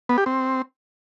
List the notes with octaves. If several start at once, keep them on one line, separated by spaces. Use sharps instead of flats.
B3
G4
C4